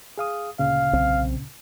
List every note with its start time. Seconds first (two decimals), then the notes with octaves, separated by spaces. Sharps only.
0.18 G#4 F5 D#6
0.59 D2 A#2 C#3 F5
0.93 B1 C4